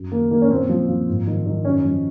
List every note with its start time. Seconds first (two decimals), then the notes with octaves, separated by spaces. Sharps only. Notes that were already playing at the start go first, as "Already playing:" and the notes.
Already playing: F#2
0.12 D#3 A#3
0.31 D#3 A#3
0.42 C#4
0.50 A#2 C4
0.69 F3
0.88 F3
1.08 G#2
1.27 D#3
1.46 D#3
1.65 F#2 C#4
1.85 F3